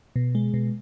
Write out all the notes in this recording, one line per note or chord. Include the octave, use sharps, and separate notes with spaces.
B2
G#3
B2